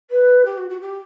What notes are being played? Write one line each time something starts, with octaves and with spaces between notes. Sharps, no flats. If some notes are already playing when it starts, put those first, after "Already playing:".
B4
G4
F#4
F#4
G4